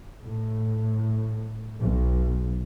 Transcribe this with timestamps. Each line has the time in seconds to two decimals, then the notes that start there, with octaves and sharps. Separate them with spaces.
0.23 A2
1.80 B1